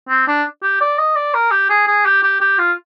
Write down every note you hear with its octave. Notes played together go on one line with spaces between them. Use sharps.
C4
D4
G4
D5
D#5
D5
A#4
G4
G#4
G#4
G4
G4
G4
F4